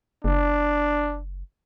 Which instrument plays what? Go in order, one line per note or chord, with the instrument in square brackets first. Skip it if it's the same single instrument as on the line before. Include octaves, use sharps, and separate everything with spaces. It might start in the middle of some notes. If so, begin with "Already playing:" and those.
[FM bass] F#1 [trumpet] D4